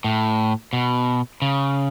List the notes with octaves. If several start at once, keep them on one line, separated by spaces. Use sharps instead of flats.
A2
B2
C#3